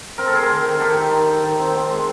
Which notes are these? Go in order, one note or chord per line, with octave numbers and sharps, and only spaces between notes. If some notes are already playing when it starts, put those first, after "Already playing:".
C4 A#4
A4
C4 G#4 A#4
D#3
D#3
D#4 G4 A4
D#3
D#4
D#4
D#3
C4
C4
G#3